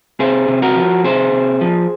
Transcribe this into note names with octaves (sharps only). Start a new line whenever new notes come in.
C3 G#4 C5
C3
F#4 A#4
F3
C3 G#4 C5
C3
F3